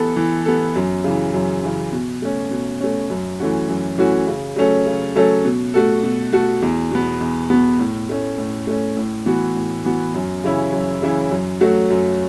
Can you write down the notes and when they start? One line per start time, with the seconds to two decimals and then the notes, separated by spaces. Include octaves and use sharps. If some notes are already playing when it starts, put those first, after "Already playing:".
Already playing: E3 B3 A4
0.16 E3
0.45 B3 A4
0.76 F#2
1.04 C#3 E3
1.34 F#2
1.63 C#3 E3
1.92 B2
2.22 A3 C#4
2.51 B2
2.81 A3 C#4
3.10 F#2
3.39 E3 A3 C#4 F#4
3.68 F#2
3.98 E3 A3 C#4 F#4
4.27 C#3
4.56 F#3 A3 C#4 A4
4.86 C#3
5.16 F#3 A3 C#4 A4
5.45 B2
5.74 A3 F#4 A4
6.03 B2
6.33 A3 F#4 A4
6.62 E2
6.91 B2 B3
7.21 E2
7.50 B2 B3
7.79 A2
8.09 A3 C#4
8.38 A2
8.67 A3 C#4
8.97 A2
9.26 E3 B3 F#4
9.55 A2
9.84 E3 B3 F#4
10.14 F#2
10.44 C#3 E3 C#4 E4
10.72 F#2
11.02 C#3 E3 C#4 E4
11.31 F#2
11.61 F#3 A3 F#4
11.90 F#2